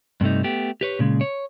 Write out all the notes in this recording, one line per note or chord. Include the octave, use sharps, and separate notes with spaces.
G2 C3 A3 D#4
A3 B3 G4
G4 B4 C#5
A#2 C#3 G#3
C#5